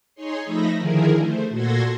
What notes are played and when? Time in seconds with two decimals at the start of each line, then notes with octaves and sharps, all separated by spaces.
0.15 D#4 G#4 C#5 C6
0.45 F3 A3 D#4 E5 B5 A#6
0.77 D3 D#3 F3 E4 G#4 A#4
1.18 A3 C5
1.50 A#2 F#4 A4 C6 G#6 A#6